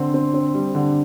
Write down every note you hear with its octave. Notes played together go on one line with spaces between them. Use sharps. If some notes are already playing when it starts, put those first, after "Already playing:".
Already playing: D3 C4
C4
C4
G3
D3